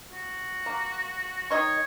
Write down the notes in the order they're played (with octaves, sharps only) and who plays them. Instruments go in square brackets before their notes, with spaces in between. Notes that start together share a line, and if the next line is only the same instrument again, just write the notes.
[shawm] F#4
[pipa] A#3
[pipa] D#3 D#5 C#6 [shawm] C#5